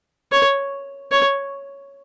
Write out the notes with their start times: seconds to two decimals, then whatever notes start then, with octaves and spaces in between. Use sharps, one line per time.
0.32 C#5
1.12 C#5